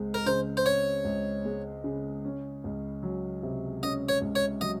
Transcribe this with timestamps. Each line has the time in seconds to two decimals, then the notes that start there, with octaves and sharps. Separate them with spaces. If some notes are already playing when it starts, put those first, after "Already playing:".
Already playing: C#2 G#3 C4
0.14 A#4
0.26 C#3 C5
0.57 C5
0.66 C4 C#5
1.05 C#2
1.45 G#3
1.84 C#3
2.25 C#4
2.64 C#2
3.03 F#3
3.43 C3
3.82 C#4 D#5
4.09 C#5
4.22 C#2
4.35 C#5
4.61 F#3 D#5